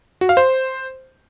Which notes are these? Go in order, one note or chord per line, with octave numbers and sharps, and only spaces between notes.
F#4
F5
C5